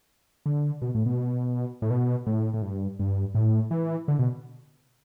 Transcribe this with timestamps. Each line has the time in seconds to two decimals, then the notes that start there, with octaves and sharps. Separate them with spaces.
0.46 D3
0.82 B2
0.95 A2
1.06 B2
1.82 A2
1.90 B2
2.27 A2
2.54 A2
2.62 G2
3.00 G2
3.35 A2
3.71 E3
4.08 D3
4.19 B2